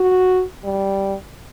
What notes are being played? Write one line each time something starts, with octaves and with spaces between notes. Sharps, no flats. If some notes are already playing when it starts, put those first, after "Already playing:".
Already playing: F#4
G3